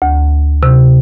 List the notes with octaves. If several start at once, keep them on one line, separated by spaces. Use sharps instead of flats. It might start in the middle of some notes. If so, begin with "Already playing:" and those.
D2
C3